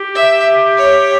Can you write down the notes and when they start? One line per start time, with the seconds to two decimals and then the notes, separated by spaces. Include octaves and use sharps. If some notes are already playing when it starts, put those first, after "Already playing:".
Already playing: G4
0.15 E5
0.77 C#5